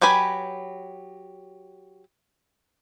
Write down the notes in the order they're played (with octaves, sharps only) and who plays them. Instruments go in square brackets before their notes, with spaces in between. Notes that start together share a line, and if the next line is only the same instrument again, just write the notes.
[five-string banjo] F#3 G4 B4 G#5 B5